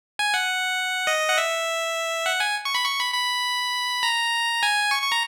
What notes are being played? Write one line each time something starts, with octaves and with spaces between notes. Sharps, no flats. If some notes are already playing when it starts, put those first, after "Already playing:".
G#5
F#5
D#5
F#5
E5
F#5
G#5
C#6
B5
C#6
B5
B5
A#5
G#5
C#6
C#6
A#5